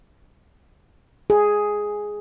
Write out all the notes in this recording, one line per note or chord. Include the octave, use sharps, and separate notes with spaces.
G#4